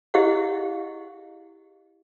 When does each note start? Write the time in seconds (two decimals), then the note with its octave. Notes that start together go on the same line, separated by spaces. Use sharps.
0.14 E4 G4 G#4 D#5 F5 F#5